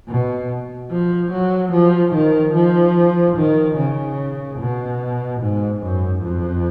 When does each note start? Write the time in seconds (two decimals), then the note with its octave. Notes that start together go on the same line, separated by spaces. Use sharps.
0.09 B2
0.91 F3
1.32 F#3
1.73 F3
2.14 D#3
2.54 F3
3.37 D#3
3.77 C#3
4.60 B2
5.41 G#2
5.82 F#2
6.23 F2